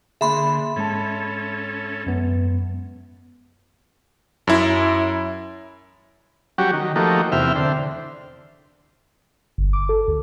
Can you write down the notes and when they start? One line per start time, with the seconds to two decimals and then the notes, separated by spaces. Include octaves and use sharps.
0.21 D3 A#3 G#4 E5 B5 C6
0.76 G#2 G#3 C#4 A4 A5
2.07 F#2 B3
4.47 F#2 E4
6.58 F#3 G3 C#4 F#4 G4
6.73 D#3
6.96 F3 A3 A#3 D#4 F#4 G4
7.32 E2 C3 E5 G5 F6
7.55 D3 C5
9.58 G1
9.73 D6
9.89 A4
10.08 D2